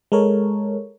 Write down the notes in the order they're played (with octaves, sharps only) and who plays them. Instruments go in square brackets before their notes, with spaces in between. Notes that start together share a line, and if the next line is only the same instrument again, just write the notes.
[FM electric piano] G#3 A4 A#4 C#5